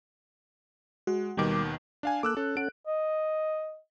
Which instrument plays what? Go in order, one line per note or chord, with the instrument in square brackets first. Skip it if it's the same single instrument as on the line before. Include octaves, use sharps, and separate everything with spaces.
[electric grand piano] G#3 [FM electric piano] F#4
[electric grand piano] D#2 B2 D#3 [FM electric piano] G3 D6
[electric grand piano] D4 F5 G#5
[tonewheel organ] A#3 A4 [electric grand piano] D6 E6 F#6
[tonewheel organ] C#4 [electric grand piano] A4
[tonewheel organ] C#4 A4 F#5 [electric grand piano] D7
[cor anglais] D#5